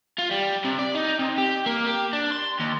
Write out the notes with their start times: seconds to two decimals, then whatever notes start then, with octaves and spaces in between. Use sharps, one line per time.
0.19 F4
0.31 G3
0.65 C3
0.79 D5
0.95 D#4
1.19 C3
1.38 G4
1.66 A#3
1.86 G4
2.13 D4
2.32 C6
2.60 D#2